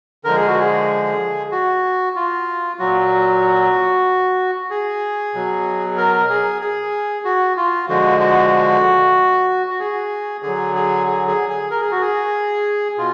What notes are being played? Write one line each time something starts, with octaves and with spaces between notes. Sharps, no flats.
D3 F3 G#3 A#4
G#4
F#4
G#4
F#4
F4
A#2 F#3 F#4
G#4
B2 F#3
A#4
G#4
G#4
F#4
F4
D3 F3 G#3 F#4
F#4
F#4
G#4
D3 F#3 G#4
G#4
G#4
G#4
G#4
A#4
G#4
F#4
G#4
B2 F4